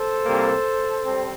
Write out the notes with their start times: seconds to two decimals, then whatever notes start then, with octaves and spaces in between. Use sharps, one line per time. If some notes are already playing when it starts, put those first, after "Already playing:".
Already playing: A4 C5
0.24 C2 C3 G3 A#3
1.06 G3 C4